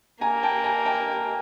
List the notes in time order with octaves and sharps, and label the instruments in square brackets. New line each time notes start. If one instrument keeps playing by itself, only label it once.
[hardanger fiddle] A#3 [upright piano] G#5 A#5
[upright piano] G5 A5
G#5 A#5
G5 A5